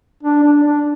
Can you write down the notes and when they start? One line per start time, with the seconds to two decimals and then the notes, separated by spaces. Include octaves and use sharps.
0.23 D4
0.43 D4
0.63 D4